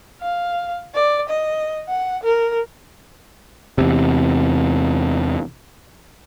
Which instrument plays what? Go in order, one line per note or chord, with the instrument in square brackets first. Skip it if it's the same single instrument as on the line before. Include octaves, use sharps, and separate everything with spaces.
[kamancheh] F5
D5
D#5
F#5
A#4
[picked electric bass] E2 C3